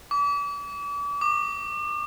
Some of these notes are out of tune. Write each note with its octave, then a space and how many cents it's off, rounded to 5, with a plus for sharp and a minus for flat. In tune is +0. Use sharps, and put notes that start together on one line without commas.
D6 -40
D6 +40